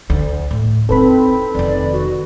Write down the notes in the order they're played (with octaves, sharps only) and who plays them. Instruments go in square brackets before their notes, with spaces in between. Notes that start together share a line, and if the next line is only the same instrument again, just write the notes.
[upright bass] D2
A2
[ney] C4 [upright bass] D#4 E4 [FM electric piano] A4 B4 B5
[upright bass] F1 D#3 [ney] D5
[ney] F#4